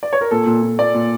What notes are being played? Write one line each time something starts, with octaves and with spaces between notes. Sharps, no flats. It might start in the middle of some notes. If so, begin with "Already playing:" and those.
D5
C#5
A#4
A#2 A4
A#2
A#2
A#2 D5
A#2